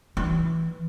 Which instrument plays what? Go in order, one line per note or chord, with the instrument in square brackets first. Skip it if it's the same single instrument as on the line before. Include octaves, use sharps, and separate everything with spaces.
[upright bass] E3